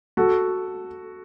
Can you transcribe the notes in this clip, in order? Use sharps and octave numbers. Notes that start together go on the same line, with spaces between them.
F#4 A4